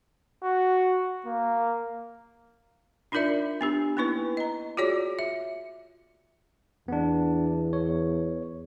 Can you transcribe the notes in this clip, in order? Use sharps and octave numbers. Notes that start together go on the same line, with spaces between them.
F#4
A#3
D4 D#4 F4 A#4 D5 E5
B3 D4 G4
A#3 B3 D#4 E4 B4
D#5 A#5
F4 F#4 G#4 C#5 D5 D6
E5
E2 B3 D4
C#5